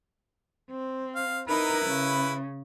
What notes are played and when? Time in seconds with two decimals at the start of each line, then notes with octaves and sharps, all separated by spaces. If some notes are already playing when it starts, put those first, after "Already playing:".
0.71 C4
1.16 F5
1.48 D#4 E4 A#4 B4
1.86 C#3